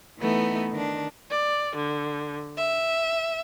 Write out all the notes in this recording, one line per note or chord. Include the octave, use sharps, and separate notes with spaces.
E3 A3 B3 D#4
D#3 D4
D5
D3
E5